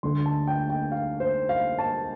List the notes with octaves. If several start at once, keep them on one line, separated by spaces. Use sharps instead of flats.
D2 D3 A3 D4 C6
A5
G5
G5
F5
C5
F5
A5